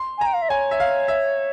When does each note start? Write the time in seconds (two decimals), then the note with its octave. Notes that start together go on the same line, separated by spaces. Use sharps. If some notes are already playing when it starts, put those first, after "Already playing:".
Already playing: C6
0.18 G#5
0.21 A#5
0.26 G5
0.34 F5
0.42 E5
0.50 C#5 G#5
0.71 E5
0.80 F5
1.08 E5